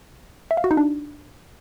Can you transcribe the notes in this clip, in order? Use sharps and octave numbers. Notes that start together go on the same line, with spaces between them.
E5
F5
F#4
D#4
D4